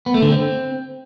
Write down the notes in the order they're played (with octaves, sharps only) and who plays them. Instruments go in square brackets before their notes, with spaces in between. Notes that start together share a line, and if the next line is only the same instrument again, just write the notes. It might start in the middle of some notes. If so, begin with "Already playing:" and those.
[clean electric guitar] B3
A3
D3
C4